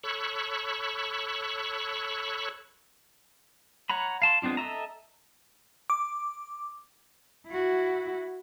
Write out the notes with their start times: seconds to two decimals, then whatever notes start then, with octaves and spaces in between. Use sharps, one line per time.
0.03 A4 C#5 B5 C#6 E6 F#6
3.90 C#5 F#5 A#5 B5
4.22 F5 A5 C6
4.42 G#3 B3 C4 D4 F4
4.57 A4 D#5 E5 A#5
5.90 D6
7.48 E4 F#4